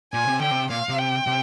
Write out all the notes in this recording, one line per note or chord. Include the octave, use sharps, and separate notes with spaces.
A#2 G#5
C3
D3 G5
C3
A#2 F5
C3
G5
C3